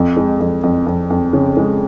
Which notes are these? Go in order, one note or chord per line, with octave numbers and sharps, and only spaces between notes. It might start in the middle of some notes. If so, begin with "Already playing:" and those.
Already playing: F2
G#3
F2
F2
F2
F2
C#3
G#3